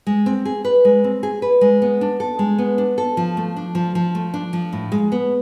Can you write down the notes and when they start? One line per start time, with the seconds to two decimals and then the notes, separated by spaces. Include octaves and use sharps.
0.07 G#3
0.26 C4
0.45 G#4
0.65 B4
0.85 G#3
1.04 C4
1.23 G#4
1.42 B4
1.61 G#3
1.82 B3
2.01 D4
2.20 A4
2.39 G#3
2.58 B3
2.78 D4
2.98 A4
3.17 F3
3.37 A3
3.56 D4
3.75 F3
3.95 F3
4.15 A3
4.34 D4
4.53 F3
4.73 A2
4.92 G#3
5.12 B3